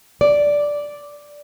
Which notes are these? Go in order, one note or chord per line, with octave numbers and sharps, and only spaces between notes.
D5